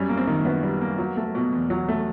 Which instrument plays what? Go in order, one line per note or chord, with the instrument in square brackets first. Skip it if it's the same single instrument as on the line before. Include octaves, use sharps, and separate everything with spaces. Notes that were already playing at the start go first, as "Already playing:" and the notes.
Already playing: [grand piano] F#2 G3 C#4
A#3
C4
D#3
F#2 B3
G3
A#3
F#3
A3
B2
E2
F#3
A3